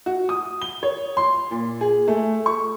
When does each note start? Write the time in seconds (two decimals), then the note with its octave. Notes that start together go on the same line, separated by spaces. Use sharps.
0.06 F#4
0.29 D#6
0.62 G7
0.83 C#5
1.17 C6
1.51 A#2
1.81 G#4
2.08 A3
2.46 C#6